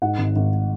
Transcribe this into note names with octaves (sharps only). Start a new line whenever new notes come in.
G#2 F#5
G#1
G#1